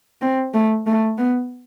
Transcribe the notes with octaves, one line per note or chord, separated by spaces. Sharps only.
C4
A3
A3
B3